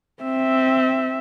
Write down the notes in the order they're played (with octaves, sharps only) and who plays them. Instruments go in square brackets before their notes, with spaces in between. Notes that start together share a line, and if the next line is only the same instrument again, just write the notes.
[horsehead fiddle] C4 E5